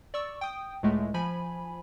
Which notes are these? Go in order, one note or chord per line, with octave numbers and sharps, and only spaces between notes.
D5 C#6 E6
G5 D#6
C#2 A2 G#3 A3
F3 G#5 B5